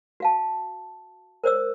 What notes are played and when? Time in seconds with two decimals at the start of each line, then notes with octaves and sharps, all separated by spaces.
0.20 F#4 F5 A5
1.44 A#4 C5 D5 E6